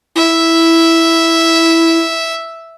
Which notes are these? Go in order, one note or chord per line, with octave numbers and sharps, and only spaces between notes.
E4 E5